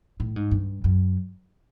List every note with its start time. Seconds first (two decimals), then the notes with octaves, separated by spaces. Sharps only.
0.20 A2
0.36 G#2
0.51 G2
0.84 F#2